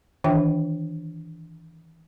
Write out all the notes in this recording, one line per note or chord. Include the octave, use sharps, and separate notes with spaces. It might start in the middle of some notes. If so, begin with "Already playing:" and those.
D#3 E3 D4 F4 E5 G5